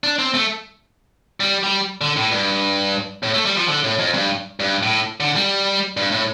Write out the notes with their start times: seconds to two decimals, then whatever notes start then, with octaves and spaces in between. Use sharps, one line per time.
0.04 D4
0.19 C4
0.34 A3
1.40 G3
1.63 G3
2.01 D3
2.16 A2
2.32 G2
3.23 A2
3.34 A3
3.46 G3
3.57 F3
3.69 D3
3.84 A2
3.99 F2
4.14 G2
4.60 G2
4.83 A2
5.20 D3
5.36 G3
5.97 G2
6.12 A2